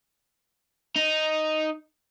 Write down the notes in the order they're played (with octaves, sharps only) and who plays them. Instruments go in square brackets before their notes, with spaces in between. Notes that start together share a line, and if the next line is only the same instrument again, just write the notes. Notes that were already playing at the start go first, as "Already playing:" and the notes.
[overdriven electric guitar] D#4